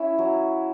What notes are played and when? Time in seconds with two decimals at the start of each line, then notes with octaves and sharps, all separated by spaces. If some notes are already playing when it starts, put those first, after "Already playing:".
Already playing: C#4 E4 B5
0.18 F#3